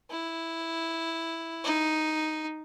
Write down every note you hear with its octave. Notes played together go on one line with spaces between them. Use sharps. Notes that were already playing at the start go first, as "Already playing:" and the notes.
E4
D#4